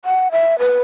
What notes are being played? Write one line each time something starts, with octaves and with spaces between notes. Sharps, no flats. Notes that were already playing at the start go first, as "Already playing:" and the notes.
F#5
E5
B4